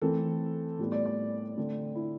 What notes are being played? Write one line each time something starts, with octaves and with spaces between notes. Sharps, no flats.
E3 A3 C4 A4
A2 G3 B3
D5
D5
D3 A3 C4
E4